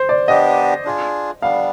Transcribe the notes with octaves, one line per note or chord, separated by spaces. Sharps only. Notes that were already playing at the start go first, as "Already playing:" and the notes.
Already playing: C5
D5
B3 D4 G4 D#5
D4 F4 G#4
G3 B3 D4 F5